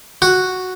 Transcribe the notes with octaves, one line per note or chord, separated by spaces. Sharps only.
F#4